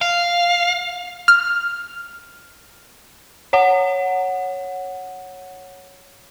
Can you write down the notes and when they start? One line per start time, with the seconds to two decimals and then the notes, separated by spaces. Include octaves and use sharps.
0.01 F5
1.28 F6
3.53 C#5 F#5